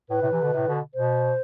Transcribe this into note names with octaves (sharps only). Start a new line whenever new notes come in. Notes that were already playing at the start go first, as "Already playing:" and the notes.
A2 B4
A2 C3
C3 E3
B2 D3
A2 C3
B2 D3
B2 C5